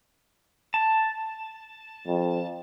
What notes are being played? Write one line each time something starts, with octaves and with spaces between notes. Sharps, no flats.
A5
F2